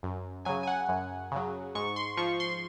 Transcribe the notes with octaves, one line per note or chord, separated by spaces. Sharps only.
F#2
C#3 F#3 G#5
G#5
F#5
F#2
C#3 F#3
G#2 C#6
C6
F3 C#6
C6